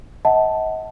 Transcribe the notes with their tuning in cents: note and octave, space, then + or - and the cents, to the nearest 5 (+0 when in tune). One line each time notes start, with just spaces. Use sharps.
D#5 +35 F#5 +0 A5 +0